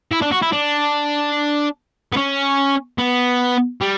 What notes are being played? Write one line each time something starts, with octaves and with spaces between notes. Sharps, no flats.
E4
D4
F#4
E4
D4
B3
C#4
B3
G3